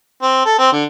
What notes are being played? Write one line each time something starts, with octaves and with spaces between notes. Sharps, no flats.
C4
A4
C4
D3